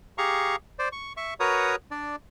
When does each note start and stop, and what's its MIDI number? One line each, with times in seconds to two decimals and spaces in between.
0.18 0.56 67
0.18 0.56 68
0.18 0.56 77
0.18 0.56 82
0.18 0.56 85
0.79 0.89 72
0.79 0.89 74
0.92 1.13 85
1.17 1.34 76
1.17 1.34 85
1.40 1.76 66
1.40 1.76 70
1.40 1.76 71
1.40 1.76 73
1.40 1.76 82
1.40 1.76 87
1.91 2.16 62
1.91 2.16 74